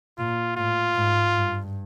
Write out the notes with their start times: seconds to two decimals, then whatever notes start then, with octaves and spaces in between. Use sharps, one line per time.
0.18 A#2 F4
0.57 A2 F4
0.95 G#2
1.34 G2